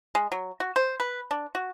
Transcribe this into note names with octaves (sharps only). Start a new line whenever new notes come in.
G#3
F#3
F#4
C5
B4
D4
F#4